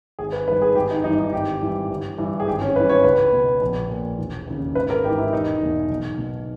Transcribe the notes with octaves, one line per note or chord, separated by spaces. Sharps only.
G#1 G#4
B4
G2 D#3 B4
G#4
G#1 G4
D#4
G2 E3 D#4
D#4
G#1 G4
G2 E3
G1
G2 E3
G#4
G#1 G4
C#4
G2 E3 B4
C#5
C#2 B4
B2
A#1
A#2
E1
D#2 C#3
G#1 B4
A#4
G#2 E3 G4
E4
E1 D#4
E2 B2
B1
B2